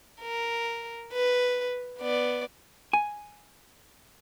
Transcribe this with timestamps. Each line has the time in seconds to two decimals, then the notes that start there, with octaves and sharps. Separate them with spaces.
0.21 A#4
1.13 B4
1.99 B3 D5
2.93 G#5